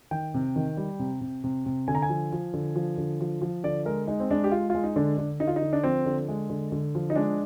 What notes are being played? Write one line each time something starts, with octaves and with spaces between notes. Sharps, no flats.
D#3 G5
C3
D#3
G3
C3
C3
C3
C3
D3 G#5
A#5
G#5
F3
F3
D3
F3
D3
F3
F3
D3 D5
G#3 A#4
G#3 D#4
C4
G#3 D4
G4
G#3 F4
G#3 F4
D#4
D3 D4
D3
D3 D#4
F4
D#4
D3
D4
F3 C4
D3
G#3
D3
D3
F3
D#4
G#3 D4